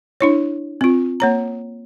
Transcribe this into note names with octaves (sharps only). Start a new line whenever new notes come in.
D4 E4 C#5
C4 F4
A#3 C#5 A#5